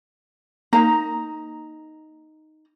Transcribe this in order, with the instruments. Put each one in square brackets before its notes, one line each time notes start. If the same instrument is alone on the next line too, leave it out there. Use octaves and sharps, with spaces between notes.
[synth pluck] A#3 [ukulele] D#4 A#5